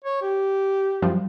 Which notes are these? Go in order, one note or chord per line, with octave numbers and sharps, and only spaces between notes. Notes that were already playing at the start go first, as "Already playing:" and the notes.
C#5
G4
F#2 F3 G3